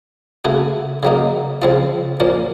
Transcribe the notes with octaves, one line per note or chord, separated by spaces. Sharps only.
C#3 A3 C#4 F#4
C#3 F#3 A#3 D#4
C#3 F3 C4 F4
A#2 F3 A#3 C#4